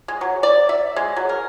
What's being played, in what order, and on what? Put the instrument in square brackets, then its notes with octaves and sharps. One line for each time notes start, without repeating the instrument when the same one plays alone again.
[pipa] G#3
F#3
D5
E5
G#3
F#3
A#4